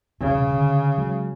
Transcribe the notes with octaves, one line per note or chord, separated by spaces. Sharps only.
E1 C2 C#3 C#4
D3
F#3 G#3